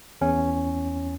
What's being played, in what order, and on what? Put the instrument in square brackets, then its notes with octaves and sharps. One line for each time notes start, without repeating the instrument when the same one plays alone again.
[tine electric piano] E2 C#4